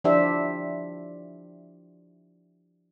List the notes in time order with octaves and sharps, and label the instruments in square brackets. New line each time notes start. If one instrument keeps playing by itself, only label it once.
[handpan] F3 D4 E4 G4 C5 E5